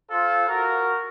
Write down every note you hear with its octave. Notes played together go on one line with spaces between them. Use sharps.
F4 A4 C5 F5
F#4 A#4